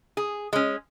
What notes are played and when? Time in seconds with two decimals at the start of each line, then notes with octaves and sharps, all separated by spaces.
0.17 G#4
0.53 G#3 C#4